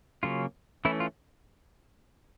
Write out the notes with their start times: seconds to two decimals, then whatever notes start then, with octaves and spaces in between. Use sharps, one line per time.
0.23 C#3 F#3 A#3 C#4 F4
0.85 E3 A3 C#4 E4
1.00 F4